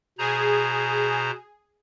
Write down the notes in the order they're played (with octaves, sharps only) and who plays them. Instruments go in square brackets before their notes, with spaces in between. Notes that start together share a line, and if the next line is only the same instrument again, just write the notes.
[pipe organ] B2 C5 A#5 [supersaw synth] G#4